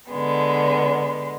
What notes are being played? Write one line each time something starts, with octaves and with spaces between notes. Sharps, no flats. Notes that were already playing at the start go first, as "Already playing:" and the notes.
D3 G#3 B3